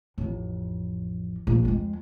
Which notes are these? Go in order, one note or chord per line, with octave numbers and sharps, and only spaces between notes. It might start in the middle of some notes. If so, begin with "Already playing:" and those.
A1 F2
A#1
F2 G#3